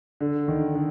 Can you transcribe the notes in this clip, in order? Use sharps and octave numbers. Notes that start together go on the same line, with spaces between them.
D3
D#3
D3